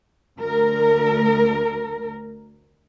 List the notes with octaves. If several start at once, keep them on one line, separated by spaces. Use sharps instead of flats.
D2 A#4